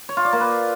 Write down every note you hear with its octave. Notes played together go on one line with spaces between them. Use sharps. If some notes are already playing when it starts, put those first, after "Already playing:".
C#5
F4
D5
A#3
B4